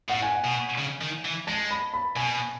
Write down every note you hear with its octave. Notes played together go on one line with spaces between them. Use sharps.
A2 F#5
G#5
F#5
B2
C#3
D#3
E3
G#3 A5
B5
B5
B2 G#5